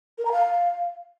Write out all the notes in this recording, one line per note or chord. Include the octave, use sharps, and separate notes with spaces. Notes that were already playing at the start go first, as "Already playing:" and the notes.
A#4
A#5
F5